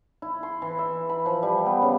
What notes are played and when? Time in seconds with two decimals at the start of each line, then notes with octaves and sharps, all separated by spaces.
0.22 E4
0.43 C6
0.62 E3
0.79 E5
1.09 B5
1.26 F3
1.43 G3
1.66 B3
1.82 C#3